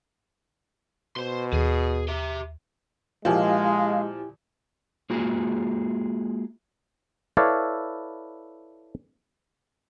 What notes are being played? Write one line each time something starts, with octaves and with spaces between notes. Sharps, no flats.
B2 C5 C6
D#2 G#4
G4 E5
A#2 F3 G#3 E4 G4 F5 G#5
G#3 A#3 F4 F#4 G#4
E4 A4 B4 C#5 D5 F5